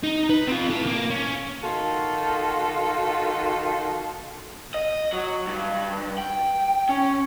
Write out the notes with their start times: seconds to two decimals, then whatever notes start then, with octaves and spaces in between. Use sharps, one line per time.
0.04 D#4
0.30 B4
0.47 C4 F4
0.70 E4 A4
0.87 A#3
1.10 C#4
1.63 D#3 F4 F#4 A4
4.74 D#5
5.13 F#3
5.47 G2
6.18 G5
6.89 C#4